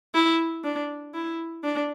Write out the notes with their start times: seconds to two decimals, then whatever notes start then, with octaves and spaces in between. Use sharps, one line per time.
0.15 E4
0.65 D4
1.14 E4
1.64 D4